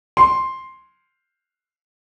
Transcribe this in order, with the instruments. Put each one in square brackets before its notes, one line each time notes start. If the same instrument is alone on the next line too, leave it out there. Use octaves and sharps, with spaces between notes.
[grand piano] C6